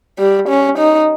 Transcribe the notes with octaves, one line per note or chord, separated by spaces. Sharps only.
G3
C#4
D#4